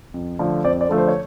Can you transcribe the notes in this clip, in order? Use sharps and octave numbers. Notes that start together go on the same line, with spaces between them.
F2
D3 F3 A3
F2 C5 D5
C5 D5
D3 F3 A3
C5
C#5